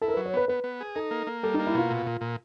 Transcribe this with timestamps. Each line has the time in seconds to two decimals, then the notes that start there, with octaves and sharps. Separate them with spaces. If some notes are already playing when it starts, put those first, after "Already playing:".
0.01 E4 A4
0.08 A#4
0.14 F#3 B4
0.26 C#5
0.34 B3 B4
0.48 B3 B4
0.64 B3
0.80 G#4
0.96 D#4 A4
1.11 A#3
1.27 A#3
1.43 G3 A4
1.54 D#4
1.59 A#3
1.67 E4
1.74 B2 F4
1.91 A#2
2.06 A#2
2.21 A#2